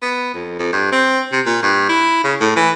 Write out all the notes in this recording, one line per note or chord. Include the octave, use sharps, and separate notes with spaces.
B3
F2
F2
G2
C4
C3
A#2
G2
E4
C#3
A2
E3